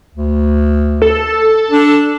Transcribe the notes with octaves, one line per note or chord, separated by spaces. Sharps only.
D2
A4
D4